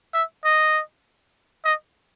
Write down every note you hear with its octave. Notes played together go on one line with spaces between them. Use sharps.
E5
D#5
D#5